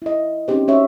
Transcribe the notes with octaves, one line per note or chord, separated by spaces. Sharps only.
E4 D#5
C4 C#4 D#4 G4 C5
C#4 F#4 G4 C#5 E5